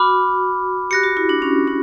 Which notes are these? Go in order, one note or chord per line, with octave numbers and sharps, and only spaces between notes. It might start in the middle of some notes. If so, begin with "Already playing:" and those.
Already playing: F#4 B5 D6 F6
G4 F#6 A#6 C#7
F#4
E4
D4
C#4
D4